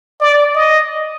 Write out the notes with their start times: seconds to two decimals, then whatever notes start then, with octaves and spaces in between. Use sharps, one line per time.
0.20 D5
0.55 D#5